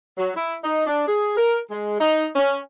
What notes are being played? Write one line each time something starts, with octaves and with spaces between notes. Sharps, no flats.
F#3
E4
D#4
D4
G#4
A#4
G#3
D#4
C#4